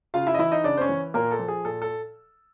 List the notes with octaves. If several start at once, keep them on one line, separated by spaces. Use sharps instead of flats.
C#3 F4 F5
E4 E5
D#5
E3 E4 E5
D#4 D#5
C#3 D4 D5
C5
C#4 C#5
E3
A#2 A#3 A#4
A4
F3
G#4
A#2 A4
A4